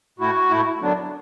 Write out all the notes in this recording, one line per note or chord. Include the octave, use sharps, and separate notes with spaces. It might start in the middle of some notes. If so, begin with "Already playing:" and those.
A2 A3 E4 F#4
A2 A3 E4
F#2 D3 F#3 B3 D4